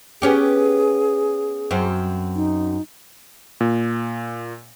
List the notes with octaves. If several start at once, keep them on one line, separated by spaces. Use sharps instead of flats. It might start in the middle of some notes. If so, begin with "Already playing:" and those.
B3 C#4 G4 G#4
F#2 C4
D#4
A#2